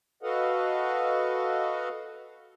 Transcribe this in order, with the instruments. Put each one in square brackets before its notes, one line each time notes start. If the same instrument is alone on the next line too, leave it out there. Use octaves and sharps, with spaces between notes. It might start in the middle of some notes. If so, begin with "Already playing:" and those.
[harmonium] F#4 A4 B4 D#5 F5 F#5